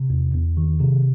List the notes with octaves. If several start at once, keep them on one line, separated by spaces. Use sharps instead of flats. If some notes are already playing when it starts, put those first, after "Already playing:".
Already playing: C3
E2
E2
D#3
C3